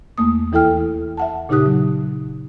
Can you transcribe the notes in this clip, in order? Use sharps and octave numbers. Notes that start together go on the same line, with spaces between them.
E2 A3 A#3 D#6
D#2 E3 E4 A4 G5 F6
E5 F#5 A5
A#2 C#3 D#4 G4 D#6 F#6
F#3